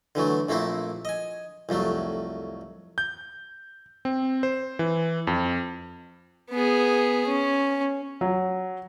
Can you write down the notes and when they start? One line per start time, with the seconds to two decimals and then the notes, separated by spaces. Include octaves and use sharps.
0.15 D3 E3 F#3 A3
0.49 A#1 A3 A#3 C4 E4
1.05 D#5 G#5
1.69 C2 F2 F#3 A3
2.98 G6
4.05 C4
4.43 C5
4.79 E3
5.27 F2
6.50 B3 G#4
7.27 C#4
8.21 F#3